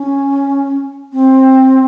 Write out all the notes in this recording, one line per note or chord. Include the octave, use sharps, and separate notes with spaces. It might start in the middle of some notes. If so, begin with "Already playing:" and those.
Already playing: C#4
C4